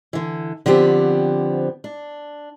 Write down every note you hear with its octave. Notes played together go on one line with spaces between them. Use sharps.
D3 E3
D3 F3 B3 C4 G4
D4